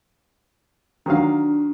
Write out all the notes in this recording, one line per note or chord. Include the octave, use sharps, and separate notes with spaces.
D#3 F#3 D4 F5